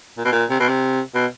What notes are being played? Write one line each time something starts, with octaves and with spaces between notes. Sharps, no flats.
A#2
B2
A#2
C3
B2
C3
B2